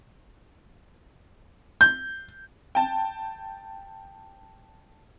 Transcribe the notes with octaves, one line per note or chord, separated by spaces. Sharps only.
G6
G5 A5